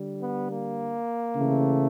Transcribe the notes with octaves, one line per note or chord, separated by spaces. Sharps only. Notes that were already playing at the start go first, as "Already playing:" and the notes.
Already playing: D3 G3
B3
A#3
C#3 E3 A3